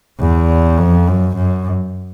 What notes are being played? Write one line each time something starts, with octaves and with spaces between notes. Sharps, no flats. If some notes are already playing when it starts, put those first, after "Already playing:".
E2
F2
F#2
F#2